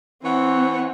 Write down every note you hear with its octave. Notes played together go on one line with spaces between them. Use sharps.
E3 C4 C#5 F#5